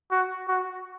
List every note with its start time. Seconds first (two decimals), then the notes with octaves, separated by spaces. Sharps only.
0.11 F#4
0.48 F#4